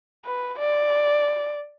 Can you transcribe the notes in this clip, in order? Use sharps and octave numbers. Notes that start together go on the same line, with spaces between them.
B4
D5